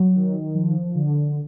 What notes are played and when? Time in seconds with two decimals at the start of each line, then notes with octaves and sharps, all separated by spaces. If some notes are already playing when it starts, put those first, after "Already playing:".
Already playing: F#3
0.15 D#3
0.55 F3
0.95 D3